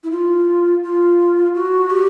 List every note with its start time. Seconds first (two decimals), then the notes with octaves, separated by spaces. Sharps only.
0.04 E4
0.11 F4
0.83 F4
1.55 F#4
1.90 G4